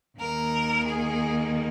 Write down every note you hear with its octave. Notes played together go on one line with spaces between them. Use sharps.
D#2 D#3 A#3 A#4
G#4